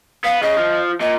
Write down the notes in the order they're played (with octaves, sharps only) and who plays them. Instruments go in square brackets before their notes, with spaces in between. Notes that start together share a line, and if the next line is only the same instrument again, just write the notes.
[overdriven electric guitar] B3 [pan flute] F5
[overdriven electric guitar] C#3 [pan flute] D#5
[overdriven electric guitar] F3
[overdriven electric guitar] A#2 [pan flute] D#5